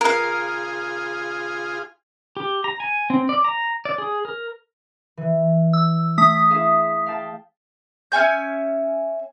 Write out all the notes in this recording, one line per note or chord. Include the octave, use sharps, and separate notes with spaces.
F4 G#4 A#4 F5
G4
A#5
G#5
C4
D5
A#5
D5
G#4
A#4
E3
E6
A3 D#6 B6
E4 G#4 F5
F5 G5 A5
C#4 E5 G#5 G6